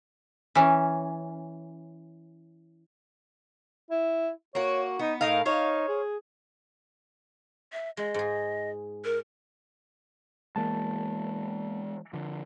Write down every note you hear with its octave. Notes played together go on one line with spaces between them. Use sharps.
E3 C#4
E4
A#3 F#4 C#5
B3 D#4
A2 D#4 A#4 F5
D#4 C5 C#5 F5
G#4
E5
G#3 D#5
G#2 G#4
A#4
E3 G#3 A#3 A5
D3 F3